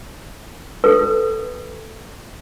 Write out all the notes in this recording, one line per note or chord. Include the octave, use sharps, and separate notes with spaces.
A4 B4